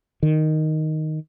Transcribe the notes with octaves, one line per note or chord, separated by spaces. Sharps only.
D#3